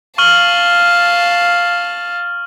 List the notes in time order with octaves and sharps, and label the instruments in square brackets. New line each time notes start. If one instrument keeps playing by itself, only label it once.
[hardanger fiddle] F5 A5 [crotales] C#6 F6 F#7